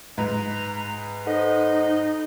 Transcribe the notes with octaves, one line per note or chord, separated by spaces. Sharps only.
G#2 G#3 B4 A#5
D#4 A4 C5 D#5 F#5